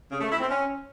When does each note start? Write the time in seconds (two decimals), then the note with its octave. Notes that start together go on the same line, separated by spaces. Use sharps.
0.11 C#3
0.20 A3
0.30 E4
0.40 C4
0.49 C#4